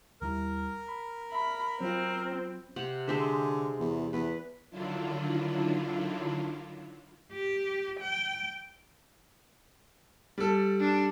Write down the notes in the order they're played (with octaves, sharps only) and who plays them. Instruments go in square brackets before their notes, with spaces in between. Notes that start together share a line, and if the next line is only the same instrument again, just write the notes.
[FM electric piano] D#2 G3 E4 [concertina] A#4
[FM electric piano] B5
[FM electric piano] E5 [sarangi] B5
[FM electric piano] F#3 F4 [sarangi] C4
[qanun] C3 F#5
[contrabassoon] D3 [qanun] G#3 C4 E5
[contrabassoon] E2
[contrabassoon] E2 [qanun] B4
[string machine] D3 D#3 F#3 D4 E4 F4
[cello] G4
G5
[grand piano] G3 A4
[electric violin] D4